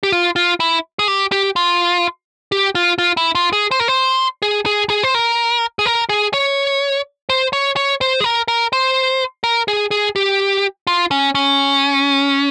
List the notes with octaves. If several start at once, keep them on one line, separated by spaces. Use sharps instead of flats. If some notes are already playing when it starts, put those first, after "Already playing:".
G4
F4
F4
E4
G#4
G4
G4
F4
G4
F4
F4
E4
F4
G#4
C5
A#4
C5
G#4
G#4
G#4
C5
A#4
G#4
A#4
G#4
C#5
C5
C#5
C#5
C5
G#4
A#4
A#4
C5
A#4
G#4
G#4
G4
F4
C#4
C#4